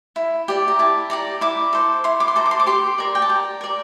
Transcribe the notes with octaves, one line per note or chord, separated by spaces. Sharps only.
E4
G4 D5
A#5
E4 A5
G4 D5 A#5
E4 D6
A4 C5
E4 C6
D6
C6
A4 C5 A#5
D6
C6
D6
G4 C6
A#4 D5
G5
A5
G4 A#5
A#4 D5